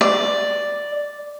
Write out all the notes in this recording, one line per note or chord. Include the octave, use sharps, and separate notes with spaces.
D5